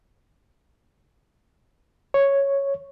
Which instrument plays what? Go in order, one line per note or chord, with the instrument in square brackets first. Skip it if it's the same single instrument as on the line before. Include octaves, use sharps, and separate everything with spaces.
[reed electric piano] C#5